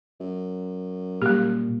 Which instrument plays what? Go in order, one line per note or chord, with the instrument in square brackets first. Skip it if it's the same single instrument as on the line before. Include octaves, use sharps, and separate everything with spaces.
[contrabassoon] F#2
[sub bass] A#2 [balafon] G3 G4 [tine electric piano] A#3